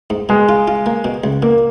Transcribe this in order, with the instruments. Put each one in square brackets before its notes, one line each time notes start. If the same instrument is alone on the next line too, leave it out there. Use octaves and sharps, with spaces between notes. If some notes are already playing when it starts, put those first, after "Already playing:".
[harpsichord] G#2
[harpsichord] B2 [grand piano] G#3
[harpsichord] F4
F4
A#3
B2
C#2
[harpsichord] A#2 [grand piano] A#3